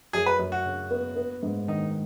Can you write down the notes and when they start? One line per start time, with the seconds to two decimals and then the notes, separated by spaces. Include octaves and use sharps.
0.13 F#2 G#4
0.26 B4
0.39 F#2
0.52 F#4
0.66 C#3
0.91 B3
1.16 B3
1.43 G#2
1.68 D#3 D#4